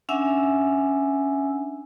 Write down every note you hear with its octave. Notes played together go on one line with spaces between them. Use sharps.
C#4 D4 E5 F#5 G#5 E6